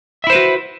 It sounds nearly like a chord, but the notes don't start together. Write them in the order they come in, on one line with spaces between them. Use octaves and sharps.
E5 E4 C5 B4 F#4